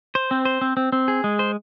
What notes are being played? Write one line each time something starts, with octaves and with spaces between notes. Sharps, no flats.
C5
C4
C5
C4
C4
C4
G#4
G#3
C5